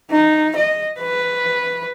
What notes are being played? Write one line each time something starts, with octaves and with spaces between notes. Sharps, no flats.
D#4
D#5
B4